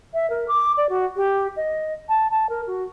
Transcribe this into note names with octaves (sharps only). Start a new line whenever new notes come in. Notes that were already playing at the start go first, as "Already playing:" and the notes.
E5
A#4
D6
D5
F#4
G4
D#5
A5
A5
A#4
F#4